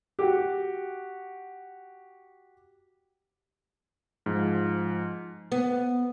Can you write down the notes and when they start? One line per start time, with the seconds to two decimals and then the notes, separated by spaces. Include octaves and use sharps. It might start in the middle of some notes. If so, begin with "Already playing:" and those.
0.19 F#4 G4
4.26 G#2 F3
5.52 B3